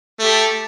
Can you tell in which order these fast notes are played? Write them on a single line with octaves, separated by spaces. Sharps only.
A3 G4 A4